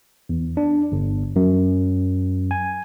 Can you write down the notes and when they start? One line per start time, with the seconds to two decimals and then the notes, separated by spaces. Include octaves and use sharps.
0.29 E2
0.57 D4
0.92 G1
1.36 F#2
2.51 G#5